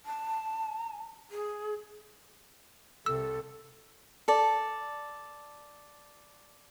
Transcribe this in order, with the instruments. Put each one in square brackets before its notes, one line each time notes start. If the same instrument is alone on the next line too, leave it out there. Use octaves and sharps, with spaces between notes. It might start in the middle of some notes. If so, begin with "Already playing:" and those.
[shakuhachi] A5
G#4
[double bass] C2 C3 [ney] A4 [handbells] E6
[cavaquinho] A4 D5